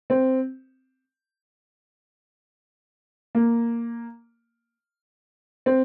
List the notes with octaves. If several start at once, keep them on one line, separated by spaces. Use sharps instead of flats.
C4
A#3
C4